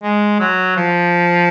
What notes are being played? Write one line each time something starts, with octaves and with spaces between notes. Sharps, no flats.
G#3
F#3
F3